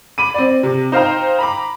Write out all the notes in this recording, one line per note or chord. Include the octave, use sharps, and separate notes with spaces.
B5 D6 D#7
C4 D5
C3
D#4 C5 F5 G5 A#5
A#5 B5 D6